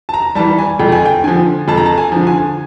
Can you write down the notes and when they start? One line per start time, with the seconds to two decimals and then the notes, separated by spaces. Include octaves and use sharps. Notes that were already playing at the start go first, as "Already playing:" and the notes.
0.09 A5
0.14 A#5
0.35 E3 G3 A5
0.58 G#5
0.79 F2 G5
0.92 G#5
1.05 G5
1.24 D3 F3 G#5
1.68 F2 A5
1.77 A#5
1.86 A5
1.98 G#5
2.12 D3 F3
2.27 G#5